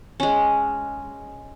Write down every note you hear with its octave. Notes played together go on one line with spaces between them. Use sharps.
G#3 C#4